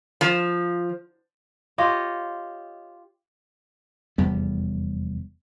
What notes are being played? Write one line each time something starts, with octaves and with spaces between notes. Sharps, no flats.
F3
F4 G4 C#5 D#5
F1 E2 G3 B3